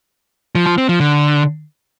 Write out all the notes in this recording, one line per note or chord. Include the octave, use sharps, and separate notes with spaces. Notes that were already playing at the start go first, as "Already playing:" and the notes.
F3
F3
C4
F3
D3